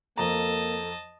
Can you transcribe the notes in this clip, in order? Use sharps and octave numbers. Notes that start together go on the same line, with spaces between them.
F2 A#3 A4 D#5 A5 A#5